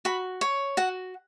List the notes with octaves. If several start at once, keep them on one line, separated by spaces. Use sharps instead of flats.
F#4 B5
C#5
F#4 F#5